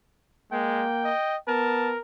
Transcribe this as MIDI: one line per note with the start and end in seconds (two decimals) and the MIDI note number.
0.52 0.86 56
0.52 1.13 58
0.52 1.38 79
1.04 1.37 75
1.48 1.95 59
1.48 2.01 70
1.48 1.90 81